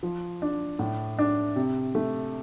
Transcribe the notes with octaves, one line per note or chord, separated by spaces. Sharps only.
F3
D4
A2
D4
C3
A3